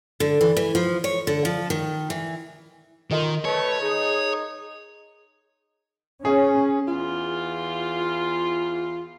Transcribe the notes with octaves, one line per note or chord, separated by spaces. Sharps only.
D3
E3
E3
F3
C#5
D3
F3
D#3
E3
D#3 F4 A#4 D#5 C6
A3 B4 C#5
D#4 G#4
C#4 G#4
E2 F4